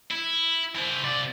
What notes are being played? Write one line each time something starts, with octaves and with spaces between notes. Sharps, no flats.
E4
E4 C5
C3 D5